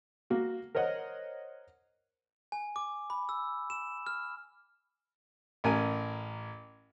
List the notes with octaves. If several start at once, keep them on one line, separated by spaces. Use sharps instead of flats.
A#3 F#4
A#4 C5 C#5 D#5 F#5
G#5
D6
B5
E6
E7
F6
A1 A#4 G#5